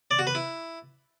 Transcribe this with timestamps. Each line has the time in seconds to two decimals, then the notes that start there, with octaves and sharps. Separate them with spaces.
0.11 D5
0.19 F#4
0.27 B4
0.35 E4